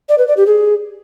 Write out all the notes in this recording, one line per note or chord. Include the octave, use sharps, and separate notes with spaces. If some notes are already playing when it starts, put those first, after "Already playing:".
D5
B4
D5
G4
G#4